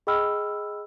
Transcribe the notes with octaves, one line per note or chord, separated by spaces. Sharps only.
G#4 D#5 G5 B5 E6 F6